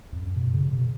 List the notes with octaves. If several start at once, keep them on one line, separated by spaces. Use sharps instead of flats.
F2
F#2
B2
C#3
B2